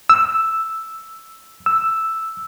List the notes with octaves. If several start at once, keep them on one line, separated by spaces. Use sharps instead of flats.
E6
E6